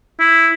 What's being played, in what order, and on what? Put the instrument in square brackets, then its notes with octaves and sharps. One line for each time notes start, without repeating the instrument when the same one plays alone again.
[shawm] E4